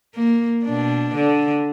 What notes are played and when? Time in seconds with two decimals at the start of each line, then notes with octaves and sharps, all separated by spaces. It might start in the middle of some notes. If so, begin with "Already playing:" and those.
0.15 A#3
0.65 B2 D4
1.14 D3